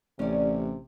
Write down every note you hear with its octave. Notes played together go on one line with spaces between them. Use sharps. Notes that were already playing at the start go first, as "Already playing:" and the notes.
A1 C3 C#4 D5